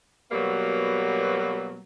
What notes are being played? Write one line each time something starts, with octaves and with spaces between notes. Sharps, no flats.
B2 F#3 G3 A#3 B3